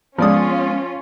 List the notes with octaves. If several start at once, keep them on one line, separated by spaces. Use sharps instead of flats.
F3 G#3 B3 C#4 F4 D5 D#6